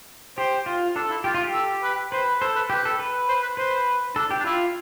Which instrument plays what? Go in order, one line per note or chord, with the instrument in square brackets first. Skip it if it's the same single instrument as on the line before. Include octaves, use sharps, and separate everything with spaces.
[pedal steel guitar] G4 [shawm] C5
[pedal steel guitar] F4
[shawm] D4 [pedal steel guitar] A4
[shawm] E4
[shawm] F4 [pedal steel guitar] G4
[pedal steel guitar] F4
G4
[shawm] A4
B4
[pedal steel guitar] B4 [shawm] C5
[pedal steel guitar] A4 [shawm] C5
[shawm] B4
[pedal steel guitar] G4 [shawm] B4
[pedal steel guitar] A4
B4
[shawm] C5
B4
[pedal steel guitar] B4 [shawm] C5
[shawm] D4 [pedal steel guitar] A4
[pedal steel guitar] G4
[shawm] D4
[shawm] E4 [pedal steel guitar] F4